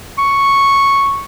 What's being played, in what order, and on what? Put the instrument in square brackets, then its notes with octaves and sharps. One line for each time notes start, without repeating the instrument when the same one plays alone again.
[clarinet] C#6